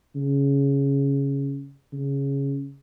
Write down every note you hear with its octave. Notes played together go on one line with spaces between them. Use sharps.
C#3
C#3